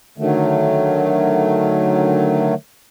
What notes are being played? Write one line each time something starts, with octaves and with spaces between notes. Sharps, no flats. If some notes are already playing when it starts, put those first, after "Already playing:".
D3 D#3 F#3 A3